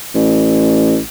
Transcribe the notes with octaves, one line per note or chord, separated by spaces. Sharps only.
A1